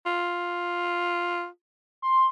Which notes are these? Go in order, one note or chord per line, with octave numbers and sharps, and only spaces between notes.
F4
C6